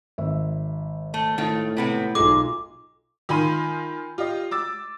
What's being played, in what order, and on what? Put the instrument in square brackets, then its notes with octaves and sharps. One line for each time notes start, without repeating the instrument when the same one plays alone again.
[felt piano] G#1 E5
[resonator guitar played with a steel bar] A3
[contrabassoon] A2 [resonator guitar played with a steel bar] D#3 A3 F4
[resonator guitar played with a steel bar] C3 B3 C4
[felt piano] B1 F4 A4 [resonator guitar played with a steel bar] G#3 [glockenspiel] D6
[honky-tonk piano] D#3 F4 G#5 B5 C6 D#7
F4 G4 D#5
D6 E6 A6